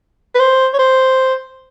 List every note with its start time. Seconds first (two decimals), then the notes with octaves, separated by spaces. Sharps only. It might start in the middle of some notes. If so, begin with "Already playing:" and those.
0.35 B4
0.40 C5
0.74 C#5
0.79 C5